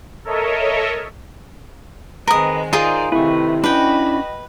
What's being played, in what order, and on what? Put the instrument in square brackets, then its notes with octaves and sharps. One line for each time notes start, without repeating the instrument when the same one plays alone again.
[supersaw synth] A4 A#4 C#5 D#5 E5
[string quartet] D#3 G#3 C4 [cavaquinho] A#4 D#6 [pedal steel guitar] B4
[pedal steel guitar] D#4 A#4 C5 [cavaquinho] F4 G#4 [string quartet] D5
[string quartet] C3 D#3 A3 [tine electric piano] E4 [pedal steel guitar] B4 C#6
[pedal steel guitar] C#4 D4 [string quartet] F#4 D#5 B5 [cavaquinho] B4 G5